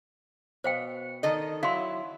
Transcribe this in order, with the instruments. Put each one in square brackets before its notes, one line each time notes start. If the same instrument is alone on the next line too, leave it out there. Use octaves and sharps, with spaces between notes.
[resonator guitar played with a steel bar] B2 [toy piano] C5 F5 G5
[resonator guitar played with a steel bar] D#3 A4 D#5
[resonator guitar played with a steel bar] F#3 E4 [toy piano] F5 C6